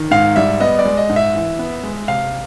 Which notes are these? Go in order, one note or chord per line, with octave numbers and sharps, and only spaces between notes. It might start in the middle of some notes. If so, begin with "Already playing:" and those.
Already playing: D#3
G#2 F5
G3 E5
B3 D#5
D5
G#3
D#5
G#2
E5
E3
B3
G#3
C3 F5